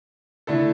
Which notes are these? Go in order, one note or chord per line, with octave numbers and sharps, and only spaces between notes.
D3 A3 E4 A4